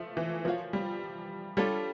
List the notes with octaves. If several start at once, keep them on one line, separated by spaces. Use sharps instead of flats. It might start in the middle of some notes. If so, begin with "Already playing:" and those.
Already playing: F3 A3
E3
F3 F#4 A#4 C#5 F5
G3
G3 D4 F4 A4 C#5